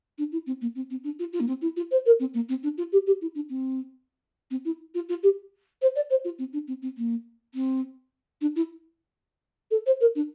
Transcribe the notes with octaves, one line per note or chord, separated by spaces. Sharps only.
D4
E4
C4
A#3
C4
C4
D4
F4
F4
A#3
C4
E4
F4
C5
A#4
C4
A#3
C4
D4
F4
G4
G4
E4
D4
C4
C4
E4
F4
F4
G4
C5
D5
C5
F4
C4
D4
C4
C4
A#3
C4
D4
E4
A4
C5
A#4
D4